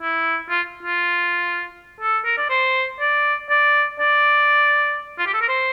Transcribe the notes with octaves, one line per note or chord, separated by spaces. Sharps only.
E4
F4
F4
A4
A#4
D5
C5
D5
D5
D5
F4
G4
A4
A#4
C5